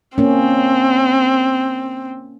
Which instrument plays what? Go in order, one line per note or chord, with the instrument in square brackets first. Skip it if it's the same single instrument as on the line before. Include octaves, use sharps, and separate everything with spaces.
[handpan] A#3 C#4 [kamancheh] C4